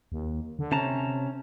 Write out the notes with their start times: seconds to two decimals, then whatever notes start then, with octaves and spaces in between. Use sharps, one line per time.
0.12 D#2
0.59 D3
0.72 C3 C#4 A5 A#5